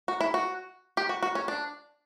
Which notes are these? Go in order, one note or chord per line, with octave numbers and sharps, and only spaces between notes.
F#4
E4
F#4
G4
F#4
F#4
C#4
D4